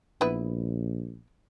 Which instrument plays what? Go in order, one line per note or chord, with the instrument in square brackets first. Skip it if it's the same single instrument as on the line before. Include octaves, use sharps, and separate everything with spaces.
[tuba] A#1 [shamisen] B3 E4 B4